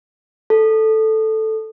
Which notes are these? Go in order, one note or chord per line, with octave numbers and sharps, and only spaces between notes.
A4